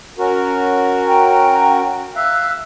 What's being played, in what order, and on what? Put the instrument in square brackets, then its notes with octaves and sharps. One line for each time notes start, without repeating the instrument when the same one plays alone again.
[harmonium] C#4 F#4 A#4
[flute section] G5 A#5
[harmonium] E5 F5 [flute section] E6 F#6